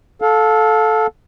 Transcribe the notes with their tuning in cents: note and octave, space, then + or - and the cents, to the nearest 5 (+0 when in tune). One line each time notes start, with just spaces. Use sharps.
A4 -10 F5 +25